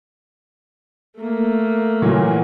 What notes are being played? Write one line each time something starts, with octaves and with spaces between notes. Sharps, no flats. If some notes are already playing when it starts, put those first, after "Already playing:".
A3 A#3
A#2 E3 F#3